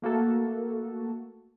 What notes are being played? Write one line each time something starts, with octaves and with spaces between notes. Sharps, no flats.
A3 A#3 F#4 A4